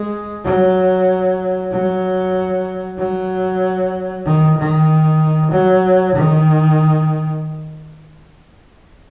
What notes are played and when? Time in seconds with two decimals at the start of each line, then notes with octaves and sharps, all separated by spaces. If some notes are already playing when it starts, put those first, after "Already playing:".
Already playing: G#3
0.45 F#3
1.72 F#3
2.98 F#3
4.25 D#3
4.57 D#3
5.51 F#3
6.15 D#3